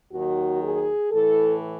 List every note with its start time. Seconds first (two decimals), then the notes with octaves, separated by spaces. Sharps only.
0.13 D#2 D#3 F#3 F#4
0.61 G#4
1.11 A2 E3 A4